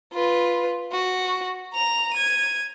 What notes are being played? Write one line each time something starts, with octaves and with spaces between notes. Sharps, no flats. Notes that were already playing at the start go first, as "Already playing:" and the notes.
F4 B4
F#4
A#5 F7
G#6 D#7